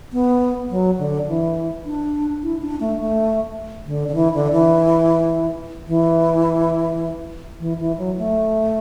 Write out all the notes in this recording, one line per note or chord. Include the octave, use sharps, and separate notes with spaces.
B3
F#3
D3
E3
D4
E4
D4
A3
A3
D3
D3
E3
D3
E3
E3
E3
E3
F#3
A3